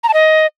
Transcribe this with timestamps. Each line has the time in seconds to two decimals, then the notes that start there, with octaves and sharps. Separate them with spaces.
0.04 A#5
0.09 A5
0.14 D#5